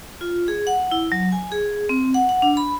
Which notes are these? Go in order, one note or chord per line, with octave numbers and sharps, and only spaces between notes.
F4
G#4
F#5
E4
F#3
G#5
G#4
C4
F#5
F#5
D4
B5